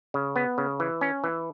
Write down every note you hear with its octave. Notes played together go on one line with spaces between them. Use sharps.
C#3
B3
C#3
E3
C#4
E3